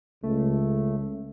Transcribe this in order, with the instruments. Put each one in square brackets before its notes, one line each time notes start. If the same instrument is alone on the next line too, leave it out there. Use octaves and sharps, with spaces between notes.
[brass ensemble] C#2 [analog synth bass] A3